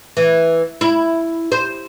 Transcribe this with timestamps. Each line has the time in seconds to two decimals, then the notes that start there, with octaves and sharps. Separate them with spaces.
0.17 E3
0.81 E4
1.52 C5